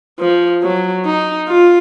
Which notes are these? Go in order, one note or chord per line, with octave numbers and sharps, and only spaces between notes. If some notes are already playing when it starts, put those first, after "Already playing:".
F3
F#3
D#4
F4